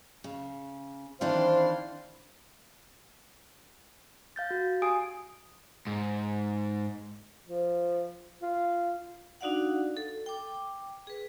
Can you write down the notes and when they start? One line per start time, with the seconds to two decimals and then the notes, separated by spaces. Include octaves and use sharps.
0.24 C#3
1.21 D#3 E3 C4 D4 E4 C5 F5 C6
4.36 F5 G6 A6
4.50 F#4
4.82 G4 G#5 D#6 D7
5.87 G#2
7.48 F3
8.42 F4
9.41 D4 D#4 F#4 D5 F5 F#5
9.97 A4
10.26 G5 D6
11.07 G#4 B4